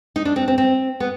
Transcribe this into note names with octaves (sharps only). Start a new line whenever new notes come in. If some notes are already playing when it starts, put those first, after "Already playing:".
D#4
D4
C4
C4
C4
B3